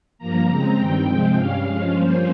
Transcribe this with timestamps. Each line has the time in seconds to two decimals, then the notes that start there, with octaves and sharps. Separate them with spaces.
0.19 G2 F3 A#3 A#5
0.48 C#3 G#3 C4
0.77 G2 D#3 G3 C4 G5
1.06 C3 F3 G#3 C4 G5
1.35 G2 G3 C#4 F5
1.64 G2 F3 G#3 C#4
1.94 G2 F3 A#3 C#4 C5